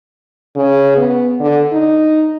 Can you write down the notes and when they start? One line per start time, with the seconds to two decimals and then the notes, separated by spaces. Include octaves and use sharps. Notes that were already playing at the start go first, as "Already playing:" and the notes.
0.56 C#3
0.96 B3
1.40 D3
1.73 D#4